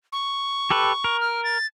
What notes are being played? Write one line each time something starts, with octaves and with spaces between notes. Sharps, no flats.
C#6
G4 A4 B4
A#4
F6
A6